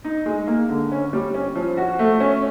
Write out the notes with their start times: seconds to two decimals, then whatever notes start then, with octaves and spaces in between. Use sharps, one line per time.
0.04 D#4
0.26 G#3
0.47 A#3
0.69 D3
0.92 C#4
1.13 G3
1.34 C#4
1.56 F3
1.77 F#4
1.99 A3
2.20 C#4